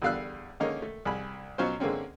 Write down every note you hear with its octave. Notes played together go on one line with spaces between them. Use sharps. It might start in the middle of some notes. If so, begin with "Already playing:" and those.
E2 D3 G3 F5 E6 F#6
D3 D#3 G#3 A#3 C#4 D#4
A3
C2 G#4 B5
B2 F#3 C#4 F4 C5
D3 G#3 A#3 C4 C#4